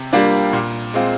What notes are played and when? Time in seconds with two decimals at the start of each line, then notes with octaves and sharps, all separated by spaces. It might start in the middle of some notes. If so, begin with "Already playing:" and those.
Already playing: C3
0.13 G3 A#3 D4 F4
0.53 A#2
0.94 G#3 C4 F4